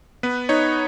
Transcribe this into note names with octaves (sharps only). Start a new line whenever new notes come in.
B3 B4
D#4 C#5